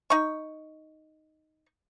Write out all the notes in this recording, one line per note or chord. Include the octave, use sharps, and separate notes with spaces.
D#4 C#6